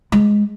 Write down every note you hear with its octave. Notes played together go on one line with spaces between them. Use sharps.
G#3